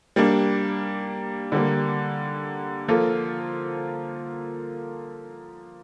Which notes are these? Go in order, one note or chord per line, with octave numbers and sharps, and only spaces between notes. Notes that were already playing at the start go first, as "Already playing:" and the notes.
G3 A#3 D4
D3 G3 A#3
F3 A#3 F4 A4